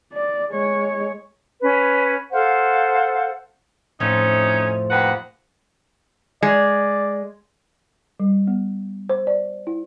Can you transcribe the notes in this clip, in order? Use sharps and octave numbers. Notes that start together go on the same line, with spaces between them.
D5
G#3 C#5
C#4 B4
A4 C5 F5 F#5
F2 A2 F3 C#4 D#4
D#2 B4 F#5
G#3 D5
G3
B3
C5
D5
E4